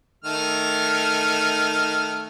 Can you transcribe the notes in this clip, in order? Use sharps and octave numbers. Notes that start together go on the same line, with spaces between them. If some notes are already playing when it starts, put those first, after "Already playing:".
D#3 A3 F6